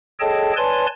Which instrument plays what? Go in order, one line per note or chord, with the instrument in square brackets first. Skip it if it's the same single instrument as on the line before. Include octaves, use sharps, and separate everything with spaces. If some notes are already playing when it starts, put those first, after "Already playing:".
[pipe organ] G#4 A4 C#5 D#5 G5 A5
B4 C#5 D5 G#5 A5 C6